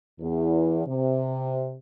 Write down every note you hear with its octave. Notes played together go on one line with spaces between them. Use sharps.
E2
C3